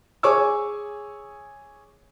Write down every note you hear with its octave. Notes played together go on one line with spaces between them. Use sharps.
G#4 C#5 G#5 C#6 D6 E6